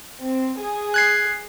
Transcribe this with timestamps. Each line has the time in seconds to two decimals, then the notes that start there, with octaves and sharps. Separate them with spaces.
0.22 C4
0.62 G#4
0.94 F#6 G#6 C7